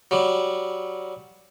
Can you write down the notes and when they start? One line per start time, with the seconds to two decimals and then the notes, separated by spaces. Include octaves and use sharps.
0.11 F#3 G3